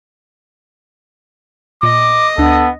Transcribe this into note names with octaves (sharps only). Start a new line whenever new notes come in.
A#2 D#5 D6
D2 B3 D4 A4